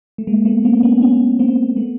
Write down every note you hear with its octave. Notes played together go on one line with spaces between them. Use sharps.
A3
G#3 A#3
A3 B3
A#3 C4
B3 C#4
B3 C#4
A#3 C4
A3 B3